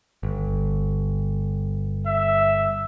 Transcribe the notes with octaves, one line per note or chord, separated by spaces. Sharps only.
G1
E5